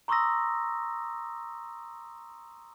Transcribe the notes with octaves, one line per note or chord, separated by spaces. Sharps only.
A#5 C6 C#6 D#6 E6 A#6